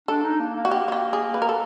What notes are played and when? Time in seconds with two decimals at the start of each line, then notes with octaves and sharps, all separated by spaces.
0.08 D4 A4
0.24 D#4
0.39 A#3
0.56 A#3
0.65 F#4
0.71 G4
0.88 F#4
0.92 G4
1.13 G#4
1.34 B4
1.42 A#4
1.49 A4